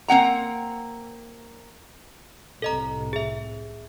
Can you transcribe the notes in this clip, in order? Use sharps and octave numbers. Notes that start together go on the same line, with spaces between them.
A#3 C4 F#5 A#5
C2 A2 C3 A4 D#5 A#5
G#4 E5